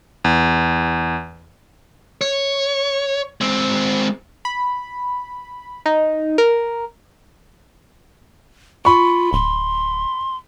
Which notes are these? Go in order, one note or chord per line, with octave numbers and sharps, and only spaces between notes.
E2
C#5
G#3 C4
B5
D#4
A#4
F4 B5 C#6
D1 C6